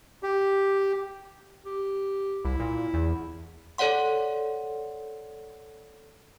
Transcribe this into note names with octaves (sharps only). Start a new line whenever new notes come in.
G4
G4
C2 E4
A#2
E2
A4 C#5 D5 F#5 C6